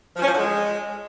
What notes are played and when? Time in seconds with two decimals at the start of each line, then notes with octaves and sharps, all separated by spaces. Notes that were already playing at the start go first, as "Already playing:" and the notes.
0.16 F3
0.22 C#4
0.28 F3
0.33 D3
0.39 G#3